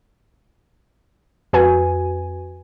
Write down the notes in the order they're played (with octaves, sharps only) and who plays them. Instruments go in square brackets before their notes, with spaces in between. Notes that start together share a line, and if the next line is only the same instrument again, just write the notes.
[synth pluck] F2 F#4 B4 G#5